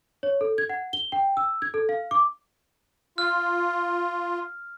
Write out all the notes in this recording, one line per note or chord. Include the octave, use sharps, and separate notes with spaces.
C#5
A4
G#6
F#5
G7
G5
E6
G#6
A4
F5
D6
F4 F6